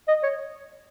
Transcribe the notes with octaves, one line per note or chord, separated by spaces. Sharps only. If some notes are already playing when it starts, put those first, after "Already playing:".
D#5
C#5